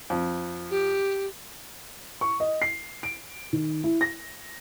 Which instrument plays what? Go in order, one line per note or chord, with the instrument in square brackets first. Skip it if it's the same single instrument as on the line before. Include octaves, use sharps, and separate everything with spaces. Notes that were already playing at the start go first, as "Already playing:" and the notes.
[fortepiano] F2
[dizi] G4
[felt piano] C#6
D#5
C7
D7
D#3
E4
A#6